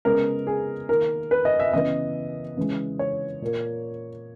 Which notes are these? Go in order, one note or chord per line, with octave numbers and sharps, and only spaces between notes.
C#3 G#3 B3 A#4
G#4
D#3 A#3 A#4
B4
D#5
E5
C#3 E3 B3 D#5
C#3 E3 G#3
C#5
A#2 A#3